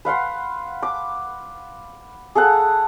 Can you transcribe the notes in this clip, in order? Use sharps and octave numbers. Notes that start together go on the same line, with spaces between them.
B4 F5 F#5 C6
D6
G#4 A4 F5 F#5